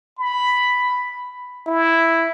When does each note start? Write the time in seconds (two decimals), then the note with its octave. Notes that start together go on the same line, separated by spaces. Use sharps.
0.19 B5
1.67 E4